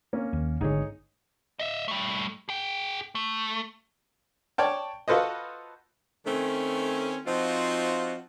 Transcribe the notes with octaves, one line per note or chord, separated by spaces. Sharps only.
A#3 C#4
D#2
G#1 D3 D#4 G#4 C#5
D#5 E5
G3 A3
G#4 G5
A3
C#5 D5 G5 A5
F4 F#4 A4 B4 C5 D#5
D#3 A3 C4 C#4
F3 C4 D#4 F4 F#4